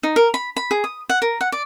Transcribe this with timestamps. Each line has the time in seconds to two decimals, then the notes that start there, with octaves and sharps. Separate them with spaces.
0.03 D#4
0.16 A#4
0.34 B5
0.57 B5
0.71 G#4
0.84 D#6
1.09 F#5
1.22 A#4
1.41 F#5
1.52 D5